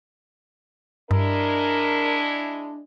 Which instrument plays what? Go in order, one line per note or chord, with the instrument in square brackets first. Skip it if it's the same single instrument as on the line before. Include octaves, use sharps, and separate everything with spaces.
[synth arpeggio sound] G2 [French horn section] G#3 E4 [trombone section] D4 [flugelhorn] A#4